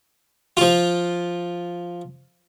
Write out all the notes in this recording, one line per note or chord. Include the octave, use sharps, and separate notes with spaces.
F3 F4